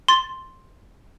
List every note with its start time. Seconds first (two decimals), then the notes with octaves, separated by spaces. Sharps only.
0.08 C6 A6